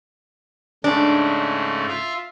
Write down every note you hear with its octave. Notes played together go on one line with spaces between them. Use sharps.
G#2 C#3 A3 D4
F4 E5 F5